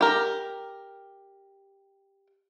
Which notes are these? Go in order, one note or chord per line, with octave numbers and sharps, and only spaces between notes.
G4 A#4